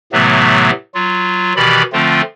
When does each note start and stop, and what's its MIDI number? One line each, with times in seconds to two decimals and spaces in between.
0.12 0.71 45
0.12 0.71 48
0.12 0.71 52
0.12 0.71 54
0.12 0.71 57
0.12 0.71 59
0.95 1.53 54
0.95 1.53 65
1.56 1.83 47
1.56 1.83 51
1.56 1.83 52
1.56 1.83 67
1.56 1.83 74
1.56 1.83 83
1.93 2.22 50
1.93 2.22 53
1.93 2.22 57
1.93 2.22 60
1.93 2.22 65